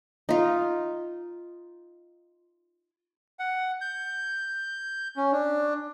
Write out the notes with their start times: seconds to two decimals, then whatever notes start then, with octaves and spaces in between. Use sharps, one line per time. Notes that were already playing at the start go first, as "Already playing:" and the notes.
0.29 D#4 F4
3.39 F#5
3.81 G6
5.17 C#4
5.32 D4